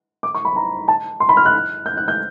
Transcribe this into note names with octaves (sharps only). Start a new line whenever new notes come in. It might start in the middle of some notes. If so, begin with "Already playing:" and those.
D6
C#6
B5
A#5
A5
C6
B5
F6
F#6
G6
F#6
G6